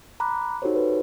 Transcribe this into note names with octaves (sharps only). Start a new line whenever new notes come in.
A#5 B5 D6 F#6
D#4 F#4 G4 A4 C5 C#5
B4